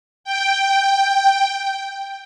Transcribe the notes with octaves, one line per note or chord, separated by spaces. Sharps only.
G5